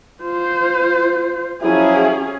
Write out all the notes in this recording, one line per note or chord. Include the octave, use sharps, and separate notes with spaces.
F4 C5
F3 F#3 C#4 E4 G#4